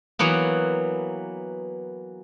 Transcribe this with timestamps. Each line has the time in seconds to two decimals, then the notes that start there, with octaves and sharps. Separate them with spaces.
0.19 E3 F#3 A#3 B3